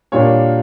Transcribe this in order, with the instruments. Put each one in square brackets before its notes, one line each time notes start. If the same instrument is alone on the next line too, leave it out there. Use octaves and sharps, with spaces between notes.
[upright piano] A#2 G3 A#3 D4 C#5